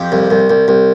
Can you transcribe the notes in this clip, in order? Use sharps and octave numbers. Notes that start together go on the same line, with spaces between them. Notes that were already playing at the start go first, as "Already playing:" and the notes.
Already playing: F2 G4
C2
C2
C2
C2